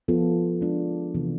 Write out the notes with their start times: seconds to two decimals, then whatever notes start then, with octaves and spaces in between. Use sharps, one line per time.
0.08 F3 B3 F4 A4
0.61 G#3 D4 F4
1.15 C3 E3 B3